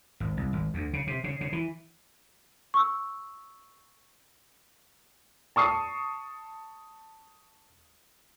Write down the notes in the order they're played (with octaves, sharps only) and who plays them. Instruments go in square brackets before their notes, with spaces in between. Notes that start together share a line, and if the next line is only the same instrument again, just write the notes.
[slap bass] G#1
C2
G#1
D2
C#3
C3
C#3
C#3
E3
[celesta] C#6 E6
[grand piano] A5 C#6 D#6 C7